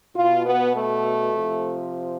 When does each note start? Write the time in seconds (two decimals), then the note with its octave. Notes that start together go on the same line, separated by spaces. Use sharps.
0.15 B2 F4
0.45 B3
0.73 A3
1.32 C3 F3